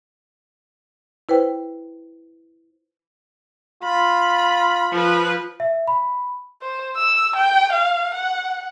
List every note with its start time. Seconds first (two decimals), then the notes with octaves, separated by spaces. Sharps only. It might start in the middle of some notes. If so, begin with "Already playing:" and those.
1.29 E4 B4 C5 G5
3.83 F4 B5
4.91 F3 B4
5.60 E5
5.88 B5
6.62 C5
6.97 E6
7.36 G5
7.72 F5
8.14 F#5